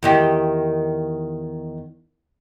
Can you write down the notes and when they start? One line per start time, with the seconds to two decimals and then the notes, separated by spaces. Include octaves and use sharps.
0.03 E2 D#3 G4